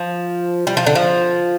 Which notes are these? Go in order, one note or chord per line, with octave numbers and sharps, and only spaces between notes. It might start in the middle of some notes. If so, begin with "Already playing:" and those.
Already playing: F3
G3
F3
D3
F3